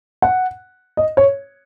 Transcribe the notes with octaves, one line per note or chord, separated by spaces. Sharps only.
F#5
D#5
C#5